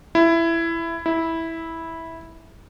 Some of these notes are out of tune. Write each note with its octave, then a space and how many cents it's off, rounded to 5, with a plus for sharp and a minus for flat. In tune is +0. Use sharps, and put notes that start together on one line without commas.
E4 +15
E4 -10